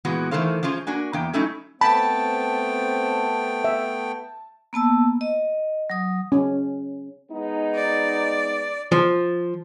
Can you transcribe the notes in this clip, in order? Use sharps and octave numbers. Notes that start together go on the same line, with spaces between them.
A#2 E3 G#3 B3 F#4
D#3 E3 A3 A4 C5 F5
F3 G#3 C#4 F4
A#3 D4 F#4 G#5
E2 A#3 G5
F#3 A3 C#4 D#4 E4
A3 B3 C4 G5 A5 B5
E5
A#3 B3 A5 E6
D#5
F#3 D#6
C#4
G#3 B3 D#4
D5
F3